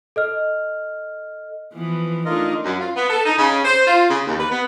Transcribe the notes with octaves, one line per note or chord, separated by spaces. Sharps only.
A4 D#5 F6
E3 F3 B3
A3 D4 D#4 F4 A#4 D#5
F#2
F4
B3
A4
D#4
C#3
C5
F4
C#3
D#2
B4
B3